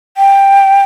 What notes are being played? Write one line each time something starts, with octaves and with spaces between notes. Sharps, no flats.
G5